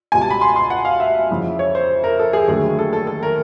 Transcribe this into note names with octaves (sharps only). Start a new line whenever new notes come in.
C#2 B2 G3 G#5
A5
B5
C6
C6
F#5
F5
E5
F2 C#3 E3
C#5
C5
A#4
A4
G#4
D#2 D3 F#3 A3 G#4
A4
A4
A4
A#4